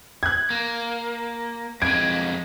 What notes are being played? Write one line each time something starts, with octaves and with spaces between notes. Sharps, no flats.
F#6 G#6
A#3
F2 G#3 G#6 D7